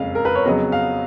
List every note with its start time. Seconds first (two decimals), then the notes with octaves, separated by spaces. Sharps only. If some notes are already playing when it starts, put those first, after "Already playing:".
Already playing: F#1 F2 C#3 G#3 F5
0.15 A#4
0.25 B4
0.35 C#5
0.45 F2 C#3 F#3 B3 D#5
0.72 F5